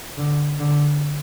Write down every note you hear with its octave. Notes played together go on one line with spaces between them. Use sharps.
D3
D3